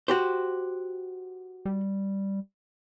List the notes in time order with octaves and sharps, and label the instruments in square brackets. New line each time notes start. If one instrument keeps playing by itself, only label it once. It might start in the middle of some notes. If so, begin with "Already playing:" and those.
[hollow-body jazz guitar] F#4 G4 C5
[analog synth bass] G3